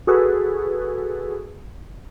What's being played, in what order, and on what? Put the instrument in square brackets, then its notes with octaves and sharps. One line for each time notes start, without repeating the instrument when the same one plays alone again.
[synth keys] F#4 G#4 A4 B4